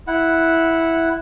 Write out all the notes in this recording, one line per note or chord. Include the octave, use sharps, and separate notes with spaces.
E4 F#5